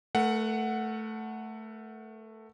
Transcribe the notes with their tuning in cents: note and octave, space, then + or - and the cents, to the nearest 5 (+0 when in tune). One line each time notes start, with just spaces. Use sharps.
A3 +0 A#4 +40 F#5 +0